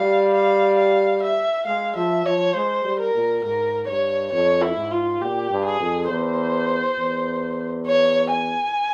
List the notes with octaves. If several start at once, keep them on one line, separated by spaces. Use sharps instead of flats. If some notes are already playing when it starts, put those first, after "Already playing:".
Already playing: G3 F5
F5
F5
E5
G#3 F5
F3 E5
F3 C#5
G#3 C5
G3
A#4
A#2
G#2 A#4
G2 C#5
F2 C#5
E4
G#2
F4
A#2 G4
G2
G#4
F2
E2 C5
E2
C#5
G#5